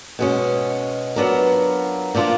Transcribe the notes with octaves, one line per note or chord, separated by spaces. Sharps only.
B2 G#3 C#4
F#3 B3 D4 F4 A#4
A#2 F3 A#3 D4 F4